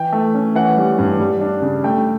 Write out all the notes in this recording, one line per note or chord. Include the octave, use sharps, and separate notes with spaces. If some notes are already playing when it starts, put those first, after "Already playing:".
Already playing: E3 G5
A3
C#4
E3 F#5
G3
G2
G3
D4
C#3
A3 G5